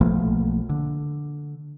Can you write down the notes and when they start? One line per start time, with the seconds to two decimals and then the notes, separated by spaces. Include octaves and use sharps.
0.01 B1 F3 A3 A#3
0.69 D3